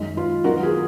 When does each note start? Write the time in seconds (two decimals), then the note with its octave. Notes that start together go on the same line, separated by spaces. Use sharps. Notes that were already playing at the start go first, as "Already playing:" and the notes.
Already playing: F#2 D#3 G#3
0.17 F4
0.44 D#3 F#3 B3 D#4 F#4 A#4
0.63 F4 G#4